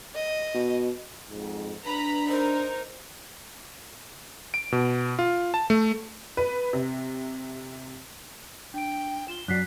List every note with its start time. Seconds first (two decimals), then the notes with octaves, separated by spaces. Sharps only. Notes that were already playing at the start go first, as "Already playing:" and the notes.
0.15 D#5
0.54 B2
1.30 F2 G#2
1.86 D4 B4 A#5 B5
2.29 D#4 A#4 C5
4.54 D7
4.72 B2
5.19 F4
5.54 A5
5.70 A3
6.37 B4
6.73 C3
8.74 D4 G5 D7
9.28 F4 E7 G7
9.48 F#2 F#3 D5 F#6 B6 C7